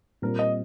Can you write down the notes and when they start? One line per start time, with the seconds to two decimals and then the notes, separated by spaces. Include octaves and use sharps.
0.22 A#2 G3 C4 A#4
0.39 D#5